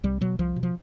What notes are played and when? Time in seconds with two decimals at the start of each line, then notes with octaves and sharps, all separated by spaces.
0.03 C2 G3
0.21 B2 F#3
0.39 C2 F3
0.56 B2
0.63 F3